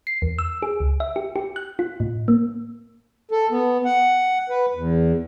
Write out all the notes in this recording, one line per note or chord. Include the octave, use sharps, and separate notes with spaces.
C7
E2
E6
G#4
C#2
E5
G4
G4
F#6
F4
A2
A#3
A4
B3
F#5
B4
E2